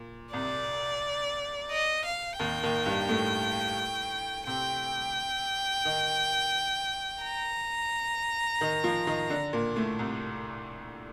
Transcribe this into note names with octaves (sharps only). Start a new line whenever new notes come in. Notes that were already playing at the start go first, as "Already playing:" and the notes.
Already playing: A#2
C2 C3 D5
D#5
F5
D#2 D#3 G5
D#2 D#3
G2 G3
A2 A3
C3 C4 G5
D#3 D#4
A#5
D#3 D#4
F3 F4
D#3 D#4
D3 D4
A#2 A#3
A2 A3
C2 C3